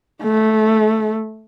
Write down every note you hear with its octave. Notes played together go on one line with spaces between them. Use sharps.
A3